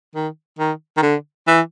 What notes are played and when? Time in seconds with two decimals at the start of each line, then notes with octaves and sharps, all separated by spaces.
0.15 D#3
0.58 D#3
0.97 D#3
1.02 D3
1.47 E3